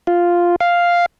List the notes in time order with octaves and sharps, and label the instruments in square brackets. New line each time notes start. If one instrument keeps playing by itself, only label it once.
[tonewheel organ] F4
F5